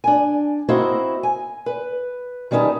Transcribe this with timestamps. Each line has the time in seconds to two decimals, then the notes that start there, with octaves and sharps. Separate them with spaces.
0.04 D4 G#5
0.69 A#3 C4 E4 F#4 C5 D#5
1.23 G#5
1.66 B4
2.51 D#3 G3 C#4 D#4 B4 A5